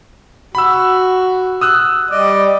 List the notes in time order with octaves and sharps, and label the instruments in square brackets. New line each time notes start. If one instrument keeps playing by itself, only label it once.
[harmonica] F#4 [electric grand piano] B5 E6
[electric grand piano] D#6 E6 F#6
[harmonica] G3 D5 D#5